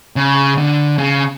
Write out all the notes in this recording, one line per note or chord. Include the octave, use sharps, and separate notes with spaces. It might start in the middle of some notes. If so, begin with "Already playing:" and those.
C#3
D3
C#3